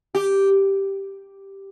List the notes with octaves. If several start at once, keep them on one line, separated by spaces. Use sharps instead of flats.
G4